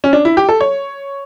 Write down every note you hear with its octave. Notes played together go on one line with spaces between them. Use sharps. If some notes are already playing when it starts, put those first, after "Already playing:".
C#4
D4
E4
G4
A4
C#5